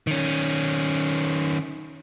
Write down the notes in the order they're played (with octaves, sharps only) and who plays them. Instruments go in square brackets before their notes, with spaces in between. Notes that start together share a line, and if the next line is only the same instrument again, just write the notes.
[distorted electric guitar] D#3 C#4